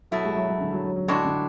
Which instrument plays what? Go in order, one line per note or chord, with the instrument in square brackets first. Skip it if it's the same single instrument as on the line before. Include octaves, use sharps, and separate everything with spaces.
[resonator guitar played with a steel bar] B2 A3 E4 [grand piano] F#3
[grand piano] G#3
F#3
F#3
D3
F#3
F#3
F#3
[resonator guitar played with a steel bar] A2 G#3 D4 F#4 [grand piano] D3
[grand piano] D3